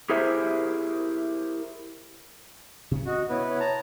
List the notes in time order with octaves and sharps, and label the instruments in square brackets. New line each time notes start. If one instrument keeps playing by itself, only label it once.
[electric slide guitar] E4 G4 G#4 A#4 C5 E5
[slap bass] C3 C#4
[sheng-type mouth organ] F#4 [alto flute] D#5
[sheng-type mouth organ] B3 E4 B4 [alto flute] C#5
[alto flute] C#5
[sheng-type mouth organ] A5 A#5